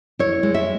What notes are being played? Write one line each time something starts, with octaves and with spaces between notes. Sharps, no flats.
E4 C#5
G#3
E5